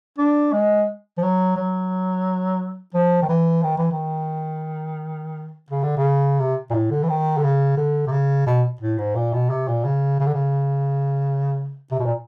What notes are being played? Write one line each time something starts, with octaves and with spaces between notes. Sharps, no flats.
D4
G#3
F3
F#3
F#3
F3
D#3
E3
D#3
E3
D#3
C#3
D3
C#3
C3
A#2
A2
D3
E3
D#3
D3
C#3
D3
C3
C#3
B2
A2
G#2
A#2
B2
C3
A#2
C#3
C#3
D3
C#3
C3
B2
A#2